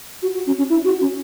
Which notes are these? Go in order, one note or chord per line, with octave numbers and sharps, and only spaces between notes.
F#4
F#4
C#4
C#4
E4
F#4
C#4